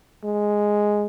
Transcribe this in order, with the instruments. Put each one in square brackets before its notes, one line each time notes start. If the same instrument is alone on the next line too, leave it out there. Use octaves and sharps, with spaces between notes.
[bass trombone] G#3